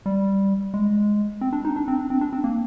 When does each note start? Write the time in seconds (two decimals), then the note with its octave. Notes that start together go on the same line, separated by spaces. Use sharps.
0.06 G3
0.74 G#3
1.41 C4
1.53 D4
1.65 D#4
1.76 D4
1.88 C4
1.99 D4
2.10 C4
2.21 D4
2.33 C4
2.44 A#3